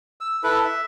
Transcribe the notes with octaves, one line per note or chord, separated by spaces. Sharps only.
E6
E4 A4 B4
E5